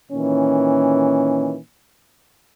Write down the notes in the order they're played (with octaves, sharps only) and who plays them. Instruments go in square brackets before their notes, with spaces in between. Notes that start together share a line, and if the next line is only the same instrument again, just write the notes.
[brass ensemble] A#2 D#3 E3 C#4